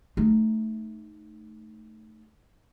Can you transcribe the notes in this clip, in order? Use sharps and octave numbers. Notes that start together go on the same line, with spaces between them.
A3 D#4